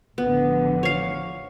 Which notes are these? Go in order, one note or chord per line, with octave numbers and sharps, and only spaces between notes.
A1 D3 F3 B3
C#5 F5